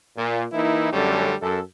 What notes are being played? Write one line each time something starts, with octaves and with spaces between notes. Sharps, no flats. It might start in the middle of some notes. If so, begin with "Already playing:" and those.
A#2
E3 A#3 D#4 E4
F#2 D3 G3 A3 C#4
F#2 A4